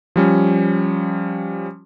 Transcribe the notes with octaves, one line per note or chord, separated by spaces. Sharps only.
F3 G3 C#4